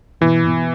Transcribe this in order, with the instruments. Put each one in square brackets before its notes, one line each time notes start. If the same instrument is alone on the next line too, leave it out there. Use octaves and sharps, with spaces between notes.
[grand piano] B2 [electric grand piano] E3
[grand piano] B2